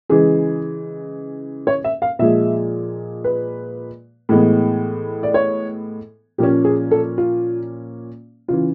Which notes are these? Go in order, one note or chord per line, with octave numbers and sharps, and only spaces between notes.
C#3 E3 G#3 G#4
C#5
E5
F5
A#2 F3 G#3 E5
B4
A2 E3 G#3 B3
D5
C#5
A#2 F3 A#3 C#4 G4
G#4
A4
F4
C#3 E3 F4